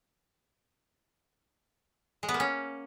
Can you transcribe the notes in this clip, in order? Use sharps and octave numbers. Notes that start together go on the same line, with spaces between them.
G#3
B3
A#3
C#4